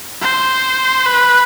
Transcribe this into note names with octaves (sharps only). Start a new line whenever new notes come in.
C5
B4